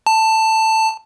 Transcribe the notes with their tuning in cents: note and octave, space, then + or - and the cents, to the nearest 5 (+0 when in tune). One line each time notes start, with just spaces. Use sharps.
A5 +10